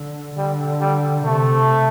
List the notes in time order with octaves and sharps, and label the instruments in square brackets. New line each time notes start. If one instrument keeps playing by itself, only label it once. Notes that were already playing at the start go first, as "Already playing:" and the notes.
Already playing: [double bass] D3
[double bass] D3 [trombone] G3
[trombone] G3
[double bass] C3 [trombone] A3